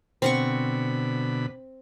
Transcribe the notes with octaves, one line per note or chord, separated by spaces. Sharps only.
B2 D3 C4 F#5 B5 C#6